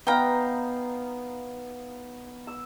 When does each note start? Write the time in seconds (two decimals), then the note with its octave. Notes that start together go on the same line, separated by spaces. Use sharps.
0.07 B3 D#4 F5 G5 A#5
2.47 E6